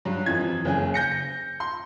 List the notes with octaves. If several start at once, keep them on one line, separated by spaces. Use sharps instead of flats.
G2 F#3
F2 E3 G#6
F#1 C#4 G#4
G6 A#6 C#7
C6